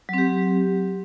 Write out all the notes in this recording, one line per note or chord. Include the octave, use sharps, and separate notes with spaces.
F#3 C4 G4